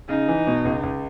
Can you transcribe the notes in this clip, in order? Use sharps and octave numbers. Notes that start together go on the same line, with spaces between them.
C#3 D#4
E3
B2
C#2
C#2